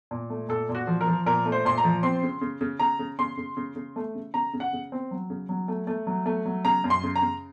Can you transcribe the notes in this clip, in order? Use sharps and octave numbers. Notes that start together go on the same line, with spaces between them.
A#2
A3
A#2 A4
A#2
F#4
F3
A#4
F3
A#2 A#4
A3
C5
A#2 C6
A#5
F3
C4 C6
C#3
C#3
C#3
C#3 A#5
C#3
C#3 C6
C#3
C#3
C#3
A3
C#3
C#3 A#5
C#3
F#5
C#3
C4
F#3
C#3
F#3
A3
A3
F#3
A3
F#3
C#3 A#5
F#2
C6
C#3
A#5
C#3